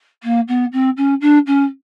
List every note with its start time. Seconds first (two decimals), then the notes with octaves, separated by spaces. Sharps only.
0.23 A#3
0.48 B3
0.72 C4
0.97 C#4
1.21 D4
1.46 C#4